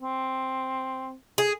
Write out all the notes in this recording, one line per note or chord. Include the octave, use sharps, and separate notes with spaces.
C4
G#4